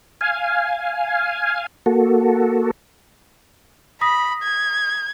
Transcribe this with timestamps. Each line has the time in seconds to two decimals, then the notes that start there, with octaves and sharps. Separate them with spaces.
0.21 F5 G#5
1.86 A#3 F#4 A4
4.01 B5 D#6 A#6 B6
4.42 G#6